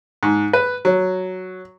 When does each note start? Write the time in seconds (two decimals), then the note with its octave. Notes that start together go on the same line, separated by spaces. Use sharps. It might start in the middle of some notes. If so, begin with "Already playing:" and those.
0.23 G#2
0.53 B4
0.85 F#3